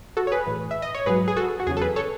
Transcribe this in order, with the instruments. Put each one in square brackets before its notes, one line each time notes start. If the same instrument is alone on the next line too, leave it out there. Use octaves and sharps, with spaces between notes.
[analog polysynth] F#4 A4
C#5
G#4 B4
A2 E3
E5
D#5
C#5
G#2 F#3 G#4 B4
G#4
F#4 A4
F#4
E2 C#3 F#3 G#4
A4
G#4 B4
A4 C#5